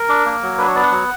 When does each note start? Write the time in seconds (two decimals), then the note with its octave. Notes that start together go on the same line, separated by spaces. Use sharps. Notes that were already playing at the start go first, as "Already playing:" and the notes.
Already playing: A#4
0.09 D4
0.25 A#3
0.42 F#3
0.58 D4 B4
0.67 C#5
0.75 B3 D5
0.83 F#5
0.91 F#3